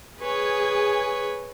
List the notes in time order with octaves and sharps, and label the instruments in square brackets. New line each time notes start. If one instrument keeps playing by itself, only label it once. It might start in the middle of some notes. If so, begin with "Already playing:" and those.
[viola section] G#4 G#5 [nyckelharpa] B4 C#5